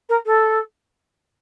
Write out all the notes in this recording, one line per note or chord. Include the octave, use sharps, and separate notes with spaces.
A#4
A4